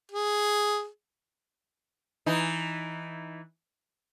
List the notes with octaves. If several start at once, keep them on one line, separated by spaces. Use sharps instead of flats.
G#4
E3 D#4